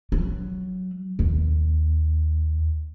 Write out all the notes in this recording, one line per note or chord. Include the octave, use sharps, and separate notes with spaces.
F#3
D#2